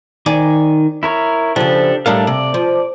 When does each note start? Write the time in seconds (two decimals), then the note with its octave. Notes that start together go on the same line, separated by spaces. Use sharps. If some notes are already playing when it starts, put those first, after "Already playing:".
0.26 D#3 D5 G#5
1.03 E4 A#4 C#5
1.56 C#3 F3 D4 G4 A4
2.06 A2 G3 D4 A4 A#4 F5
2.27 C3 D5
2.54 F3